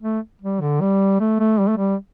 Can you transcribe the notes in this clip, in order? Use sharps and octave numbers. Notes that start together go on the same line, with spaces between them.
A3
G3
D3
G3
A3
A3
G3
A3
G3